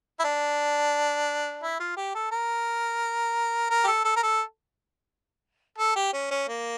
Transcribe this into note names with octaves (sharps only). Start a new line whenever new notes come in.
E4
D4
E4
F4
G4
A4
A#4
A#4
G4
A4
A4
A#4
A4
A4
G4
C#4
C#4
A#3